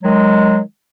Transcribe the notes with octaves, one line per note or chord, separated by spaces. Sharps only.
D#3 F#3 G#3